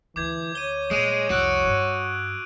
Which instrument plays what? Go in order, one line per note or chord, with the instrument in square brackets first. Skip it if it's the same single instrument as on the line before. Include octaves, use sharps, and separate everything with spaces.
[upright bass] D2 [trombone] E3 [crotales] D6 G6 G#6
[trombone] C#5 [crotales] D#7 G7
[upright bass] A#2 [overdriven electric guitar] G#3 [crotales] D#6 D#7 F7
[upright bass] C2 F2 [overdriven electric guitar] F#4 [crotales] E6 F#6 D7
[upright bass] G2